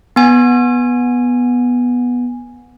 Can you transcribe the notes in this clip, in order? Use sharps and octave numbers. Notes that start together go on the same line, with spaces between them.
B3 G#5